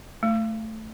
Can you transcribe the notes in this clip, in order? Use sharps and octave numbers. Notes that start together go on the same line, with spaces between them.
A3